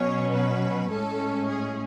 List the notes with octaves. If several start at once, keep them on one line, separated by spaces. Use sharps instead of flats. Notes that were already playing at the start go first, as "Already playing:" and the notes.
Already playing: B2 F#3 C#4 C#5
B4
A2 G#3 C#4 A4
G#4